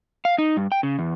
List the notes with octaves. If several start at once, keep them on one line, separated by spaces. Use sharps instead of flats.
F5
D#4
G2
G5
C#3
E2